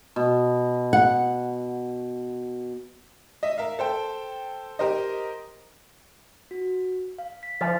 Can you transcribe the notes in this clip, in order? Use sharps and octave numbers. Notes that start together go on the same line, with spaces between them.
B2
F#5
D#5 E5
A#4 E5 F5
A4 C5 G5
G4 A#4 C5 D#5
F#4
F5
B6
F3 C6 F6 A6